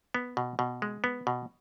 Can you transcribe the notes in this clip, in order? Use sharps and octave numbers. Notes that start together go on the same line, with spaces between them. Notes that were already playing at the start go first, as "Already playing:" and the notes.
B3
B2
B2
G#3
B3
B2